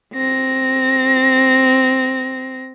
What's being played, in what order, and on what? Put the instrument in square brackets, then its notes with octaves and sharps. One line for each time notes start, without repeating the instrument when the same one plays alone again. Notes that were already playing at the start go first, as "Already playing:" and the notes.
[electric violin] C4 A#6